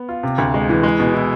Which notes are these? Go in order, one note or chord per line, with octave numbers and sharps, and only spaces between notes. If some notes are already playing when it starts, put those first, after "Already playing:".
Already playing: B3
F4
C3
D2
G#3
E3
G#3
B2
E4